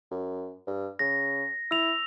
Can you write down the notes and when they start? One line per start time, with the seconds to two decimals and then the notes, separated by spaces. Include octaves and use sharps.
0.11 F#2
0.67 G2
0.99 C#3 A#6
1.71 E4 E6 F7